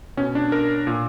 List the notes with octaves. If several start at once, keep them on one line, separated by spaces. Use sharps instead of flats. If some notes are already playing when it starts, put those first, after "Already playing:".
B2 C#4
D4
A#4
A#2